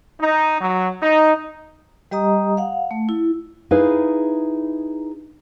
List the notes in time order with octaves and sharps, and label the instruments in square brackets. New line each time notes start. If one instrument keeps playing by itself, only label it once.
[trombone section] D#4
F#3
D#4
[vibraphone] G3 G4 D#5 A#5 D#6
F5 F#5
A3
E4
[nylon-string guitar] D#4 E4 G#4 B4 F5